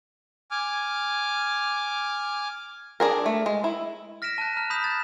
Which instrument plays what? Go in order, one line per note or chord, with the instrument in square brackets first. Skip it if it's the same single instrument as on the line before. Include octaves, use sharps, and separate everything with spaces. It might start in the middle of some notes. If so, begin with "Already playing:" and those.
[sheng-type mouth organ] G#5 D6 F6
[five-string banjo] D4 G#4 A#4
A3
G#3
E4
[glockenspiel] F6 A#6 B6 D7 E7
A5 F#6
A#5 F6 F#6
B5 D#6 G6 B6 E7
F#6 A6